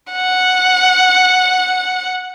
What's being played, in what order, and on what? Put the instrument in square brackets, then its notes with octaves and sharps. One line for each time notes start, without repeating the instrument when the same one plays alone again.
[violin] F#5